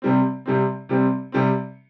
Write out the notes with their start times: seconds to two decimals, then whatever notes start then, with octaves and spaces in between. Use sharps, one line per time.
0.02 C3 G3 C4
0.46 C3 G3 C4
0.89 C3 G3 C4
1.32 C3 G3 C4